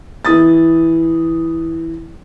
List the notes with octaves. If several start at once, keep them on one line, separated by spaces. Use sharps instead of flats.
E3 E4 D#6 A6